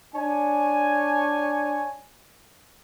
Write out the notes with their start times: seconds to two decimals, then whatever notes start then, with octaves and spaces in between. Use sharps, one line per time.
0.14 D4 C#5 G#5